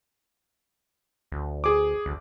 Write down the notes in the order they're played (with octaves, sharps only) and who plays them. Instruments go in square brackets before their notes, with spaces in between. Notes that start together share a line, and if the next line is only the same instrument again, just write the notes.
[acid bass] D2
[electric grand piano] G#4 D6
[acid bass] D2